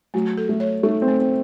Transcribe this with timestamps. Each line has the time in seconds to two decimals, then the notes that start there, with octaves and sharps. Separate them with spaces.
0.14 F#3 A3
0.38 A4
0.49 A3
0.60 C#5
0.83 A3 D#4
1.02 C4
1.08 A3
1.19 C4